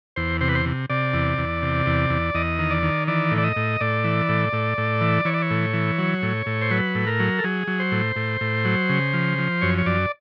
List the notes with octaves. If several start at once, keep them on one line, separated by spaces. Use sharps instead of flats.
E2 C5
C3 C5
B4
C5
C3
C3 D5
E2
E2
C3
E2
E2
E2 D#5
D#3
D5
D#3
E3 D5
A2
D5
D#5
A2
A2 D5
E3
A2
A2
A2
E3
E3 C#5
D5
C#5
A2
E3
F#3
A2
A2
C5
F#3 B4
A2
A#4
F#3
A4
F#3 G#4
F#3
C5
A2
A2
A2
F#3
C#3
F3
F3
F#2 C#5
C#5
F#2 D5